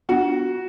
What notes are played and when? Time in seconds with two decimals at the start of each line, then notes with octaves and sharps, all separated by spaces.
0.09 B3 D4 F4 F#4